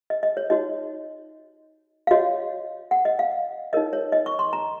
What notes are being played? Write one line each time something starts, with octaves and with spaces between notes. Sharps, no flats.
D#5
D#5
C#5
D#4 F#4 C#5 D#5
F5
F#4 C#5 D#5
F#5
D#5
F5
D#4 A#4 C#5 D#5
C#5
D#5
C#6
C6
A#5